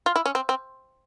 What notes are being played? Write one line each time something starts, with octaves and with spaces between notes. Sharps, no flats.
F4
E4
C#4
C4
C4